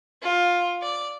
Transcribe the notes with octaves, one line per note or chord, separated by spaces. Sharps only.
F4
D5